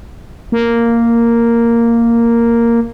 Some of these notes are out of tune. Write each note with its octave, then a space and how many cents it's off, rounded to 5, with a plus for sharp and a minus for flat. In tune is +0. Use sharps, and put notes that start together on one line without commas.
A#3 -5